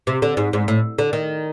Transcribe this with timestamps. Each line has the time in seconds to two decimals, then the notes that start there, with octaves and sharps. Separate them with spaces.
0.07 C3
0.22 D3
0.37 G#2
0.53 G#2
0.68 A2
0.98 D3
1.13 D#3